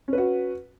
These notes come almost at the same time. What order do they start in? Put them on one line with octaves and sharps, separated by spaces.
C#4 B4 F#4